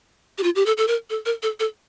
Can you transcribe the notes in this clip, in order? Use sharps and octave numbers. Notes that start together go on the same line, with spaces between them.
G4
F4
G4
A4
A4
A#4
A4
A#4
A4
A4